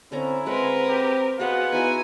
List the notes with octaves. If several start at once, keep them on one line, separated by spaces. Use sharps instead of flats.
D3 C4 C#4 E4 A#5
G#3 C4 A#4 B4 F#5
G4
B3 F4 F#4 G#4 D#5 F#5
B3 D#4 E4 F#4 G#5